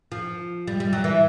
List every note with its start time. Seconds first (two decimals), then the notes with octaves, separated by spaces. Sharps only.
0.12 F3
0.67 G3
0.80 G3
0.93 F#3
1.04 E3